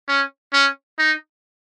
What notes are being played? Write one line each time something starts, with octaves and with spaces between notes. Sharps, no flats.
C#4
C#4
D#4